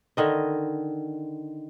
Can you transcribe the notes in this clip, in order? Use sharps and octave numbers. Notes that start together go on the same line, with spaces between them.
D3 D#3 D#5